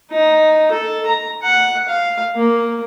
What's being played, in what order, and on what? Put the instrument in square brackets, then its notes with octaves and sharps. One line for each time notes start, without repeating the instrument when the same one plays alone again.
[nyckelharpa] D#4
A4
A#5
F#5
F5
A#3